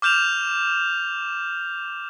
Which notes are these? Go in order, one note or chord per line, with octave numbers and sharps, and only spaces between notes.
D6 F6 G6 E7 F7